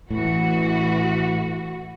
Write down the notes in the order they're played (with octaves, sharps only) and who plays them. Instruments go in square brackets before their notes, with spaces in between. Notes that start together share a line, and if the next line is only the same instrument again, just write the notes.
[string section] A1 E3 F#4 [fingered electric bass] A2